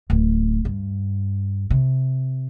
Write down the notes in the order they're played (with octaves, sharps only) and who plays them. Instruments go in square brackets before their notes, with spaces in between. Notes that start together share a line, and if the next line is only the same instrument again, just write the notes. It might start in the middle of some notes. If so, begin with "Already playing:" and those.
[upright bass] D1
G2
C3